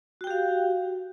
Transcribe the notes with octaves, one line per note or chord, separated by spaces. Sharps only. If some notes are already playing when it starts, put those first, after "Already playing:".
F#4 G4 F5 G5